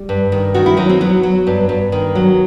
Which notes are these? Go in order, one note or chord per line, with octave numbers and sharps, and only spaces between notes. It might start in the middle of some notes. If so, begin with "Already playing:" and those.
Already playing: G3
G2
D#3
D#3 F#4
E4
F#3 D#4
C4
F#3 B3
F#3
G2
G2
D#3
F#3